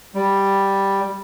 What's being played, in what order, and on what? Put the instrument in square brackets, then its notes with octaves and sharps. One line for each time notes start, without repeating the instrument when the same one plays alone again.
[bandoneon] G3